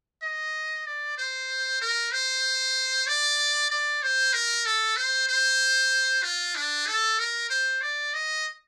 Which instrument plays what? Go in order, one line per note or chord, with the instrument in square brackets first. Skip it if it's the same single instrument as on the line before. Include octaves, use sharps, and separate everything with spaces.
[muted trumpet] D#5
D5
C5
A#4
C5
D5
D5
C5
A#4
A4
C5
C5
F4
D4
A4
A#4
C5
D5
D#5